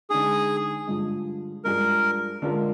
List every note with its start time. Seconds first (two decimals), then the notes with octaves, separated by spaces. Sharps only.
0.10 D3 G#3 D#4 G#4
0.88 G2 D3 F3 G#3
1.65 G2 F3 G#3 D4 G#4 A#4
2.42 D3 G#3 D4 F4 A#4